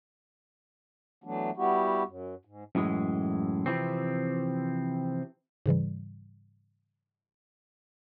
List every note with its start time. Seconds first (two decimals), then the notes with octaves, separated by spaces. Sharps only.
1.24 E3 F#3 A3 B3 D4
1.57 G3 B3 E4 F#4 G4
2.06 F#2
2.45 G#2
2.75 F#2 A2 E3 G#3
3.66 C3 E3 F3 C4
5.66 G#2 C#3 E3 G3